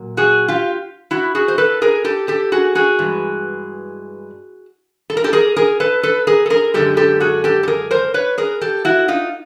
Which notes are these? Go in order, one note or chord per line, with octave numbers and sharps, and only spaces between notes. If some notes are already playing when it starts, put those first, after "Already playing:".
Already playing: A#2 F#3 A#3
F#4 G#4
F4 G4
E4 F#4
F#4 G#4
C5
A4 B4
G#4 A#4
G4 A4
G4 A4
F#4 G#4
F#4 G#4
G2 E3 G#3
A4
A#4
G4 A4
G#4 A#4
G#4 A#4
A4 B4
A4 B4
G#4 A#4
A4
G#4 A#4
F#2 D3 F3 G#3 G4 A4
G4 A4
F#4 G#4
G4 A4
A4
G#4 A#4
A#4 C5
B4 C#5
G#4 A#4
G4 A4
E4 F#4
D#4 F4